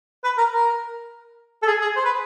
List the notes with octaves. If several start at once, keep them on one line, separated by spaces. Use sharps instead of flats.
B4
A#4
A#4
A4
G#4
G#4
C5
B4